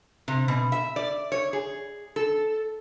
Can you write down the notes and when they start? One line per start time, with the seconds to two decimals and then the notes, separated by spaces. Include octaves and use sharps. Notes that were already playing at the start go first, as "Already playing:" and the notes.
0.28 C3
0.48 B2
0.72 E5
0.96 D5
1.32 C#5
1.53 G#4
2.16 A4